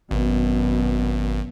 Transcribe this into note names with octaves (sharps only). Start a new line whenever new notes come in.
G#1 F#2 B2